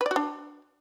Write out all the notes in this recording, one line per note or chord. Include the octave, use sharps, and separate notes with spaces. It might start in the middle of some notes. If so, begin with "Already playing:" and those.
B4
D5
F#4
D4